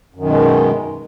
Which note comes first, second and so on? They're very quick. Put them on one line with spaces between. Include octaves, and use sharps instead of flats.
F#2 D#3 B2 G#3